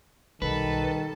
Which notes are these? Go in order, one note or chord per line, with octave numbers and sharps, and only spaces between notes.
B1 D#3 G3 A4 B4 A5